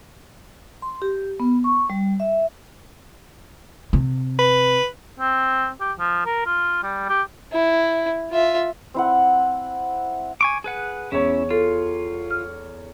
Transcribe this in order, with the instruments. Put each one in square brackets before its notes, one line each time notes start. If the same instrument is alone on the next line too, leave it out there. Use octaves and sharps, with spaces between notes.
[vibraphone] C6
G4
B3
C#6
G3
E5
[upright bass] C3
[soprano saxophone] B4
[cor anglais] C4
G4
F3
A#4
F4
G3
G4
[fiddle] E4
F4 E5
[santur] C4 E4 F#5
[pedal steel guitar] G#5 C#6 D6
G#4 B4 F#5
[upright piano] E2 C#5 [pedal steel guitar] C#4 E4
[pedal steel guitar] F4 [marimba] A4
[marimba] F6